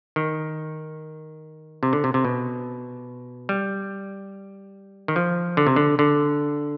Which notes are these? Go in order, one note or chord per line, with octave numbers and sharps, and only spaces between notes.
D#3
C3
D3
C3
C3
B2
G3
D#3
F3
D3
C3
D3
D3